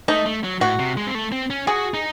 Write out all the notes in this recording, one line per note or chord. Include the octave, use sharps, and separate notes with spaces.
A3 D#4
A3
F#3
A2 F#4
C3
G#3
C4
A3
C4
C#4
F#4 G#4
D#4